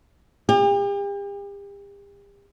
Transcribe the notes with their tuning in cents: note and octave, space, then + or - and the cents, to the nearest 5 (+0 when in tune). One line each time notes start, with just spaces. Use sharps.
G4 +40